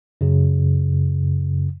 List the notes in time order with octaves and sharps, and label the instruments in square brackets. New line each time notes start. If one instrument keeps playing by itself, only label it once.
[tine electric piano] F#2 C#3